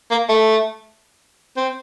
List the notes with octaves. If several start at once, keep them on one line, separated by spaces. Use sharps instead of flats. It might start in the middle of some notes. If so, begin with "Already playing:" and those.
A#3
A3
C4